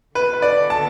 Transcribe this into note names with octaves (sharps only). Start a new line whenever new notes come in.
D3 B3 F#4 A4 B4
B4
D5
A5